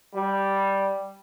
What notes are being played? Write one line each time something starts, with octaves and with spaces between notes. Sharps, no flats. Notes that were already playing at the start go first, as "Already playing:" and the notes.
G3